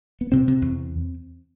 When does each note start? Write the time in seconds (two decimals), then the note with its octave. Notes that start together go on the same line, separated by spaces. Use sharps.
0.21 B3
0.32 C3 C4
0.48 C3
0.61 E2